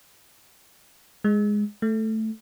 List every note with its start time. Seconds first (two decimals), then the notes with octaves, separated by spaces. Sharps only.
1.24 G#3
1.82 A3